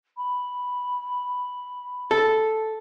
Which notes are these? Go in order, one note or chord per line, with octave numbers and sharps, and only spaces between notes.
B5
A4